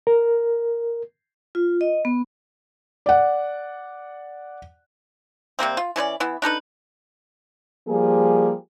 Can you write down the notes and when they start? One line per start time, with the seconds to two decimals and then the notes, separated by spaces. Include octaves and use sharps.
0.07 A#4
1.55 F4
1.81 D#5
2.05 B3
3.06 D5 F#5
5.59 C3 G3 A#3 C4
5.77 F4
5.96 E3 C#4 B4 D5
6.20 E3 B3 E4
6.42 D4 D#4 A4 B4
7.88 F3 G3 A#3 G#4